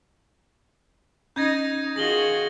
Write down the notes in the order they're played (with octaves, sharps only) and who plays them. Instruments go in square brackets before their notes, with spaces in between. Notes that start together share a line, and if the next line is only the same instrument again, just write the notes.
[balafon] C#4 [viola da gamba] D#4 [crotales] G6 G#6 A#6
[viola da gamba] D#3 F4 F#4 [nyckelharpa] G#4 [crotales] A#6 F#7 G7